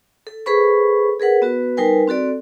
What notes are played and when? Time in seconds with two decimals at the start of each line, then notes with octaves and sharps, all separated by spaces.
0.27 A4
0.46 G#4 A4 B4 C5 B5 C#6
1.20 G#4 A#4 B4 F#5
1.42 B3 F#4 B4
1.77 G3 D#4 A#4 B4 G5 G#5
2.07 C4 F#4 A4 D5